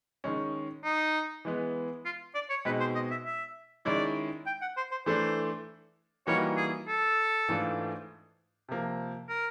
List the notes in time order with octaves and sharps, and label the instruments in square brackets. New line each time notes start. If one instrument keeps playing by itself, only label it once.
[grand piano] D#3 G#3 C#4
[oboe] D#4
[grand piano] E3 G#3 B3
[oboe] F4
D5
C#5
[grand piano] B2 G#3 C4 D#4 [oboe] B4
[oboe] C5
D#5
E5
E5
[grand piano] D#3 G#3 C#4 E4 [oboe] D5
[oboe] G5
F#5
C5
C5
[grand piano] E3 A3 D4 [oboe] C5
[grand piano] E3 G3 A#3 D#4 F#4 [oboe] C#5
[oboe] G#4
A4
[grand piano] G#2 E3 A3 D4 F4
C3 F3 A#3
[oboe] A#4